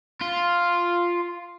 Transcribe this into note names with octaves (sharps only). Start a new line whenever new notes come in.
F4